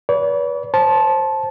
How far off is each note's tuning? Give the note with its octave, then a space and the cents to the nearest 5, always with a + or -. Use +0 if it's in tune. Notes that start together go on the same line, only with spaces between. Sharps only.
B4 -20 D5 -45
C5 +20 A5 -15